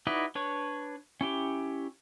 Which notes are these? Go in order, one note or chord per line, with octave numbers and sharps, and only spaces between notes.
D#4 E4 F#4 B4 D5
D4 B4 C#5 C#6
C#4 E4 G4